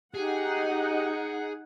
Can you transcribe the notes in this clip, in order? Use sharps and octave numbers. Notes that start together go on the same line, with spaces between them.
D#4 G4 G#4 F#5